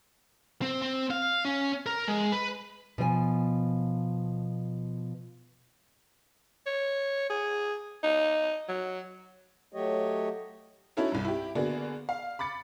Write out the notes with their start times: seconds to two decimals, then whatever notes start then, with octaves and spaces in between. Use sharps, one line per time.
0.62 C4
0.82 C4
1.11 F5
1.45 C#4
1.86 A#4
2.08 G#3
2.32 B4
2.98 B2 F3 D#5 G#5
6.67 C#5
7.30 G#4
8.03 D#4
8.69 F#3
9.73 F#3 A3 G4 C#5 D#5
10.97 C#4 D#4 E4 F#4 A4 C#5
11.12 C2 G2
11.25 E4 G4
11.55 D3 A#3 B3 D4 F#4 G#4
12.09 F5
12.39 B5 D6 A6 C#7